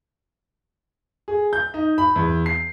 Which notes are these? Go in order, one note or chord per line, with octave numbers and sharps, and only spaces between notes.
G#4
G6
D#4
B5
E2
C7